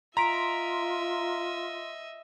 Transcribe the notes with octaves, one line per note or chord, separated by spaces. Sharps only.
F4 D#5 E5 A#5 C6 B6 D7